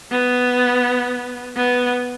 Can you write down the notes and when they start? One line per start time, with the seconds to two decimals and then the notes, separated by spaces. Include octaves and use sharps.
0.11 B3
1.56 B3